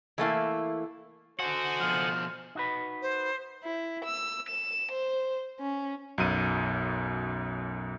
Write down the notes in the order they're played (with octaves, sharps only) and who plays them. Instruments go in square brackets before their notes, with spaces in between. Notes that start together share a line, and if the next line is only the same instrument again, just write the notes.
[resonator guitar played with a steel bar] E3 A3 A#3 E4
[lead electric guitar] F#4 [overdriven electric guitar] A4 F#5 [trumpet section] C5 D#5 G#5
[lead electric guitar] B2 F3 [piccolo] F6
[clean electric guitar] D#4 F#4 B4
[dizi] C5
[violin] E4
E6
E7
C5
C#4
[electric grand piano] B1 F#2 D#7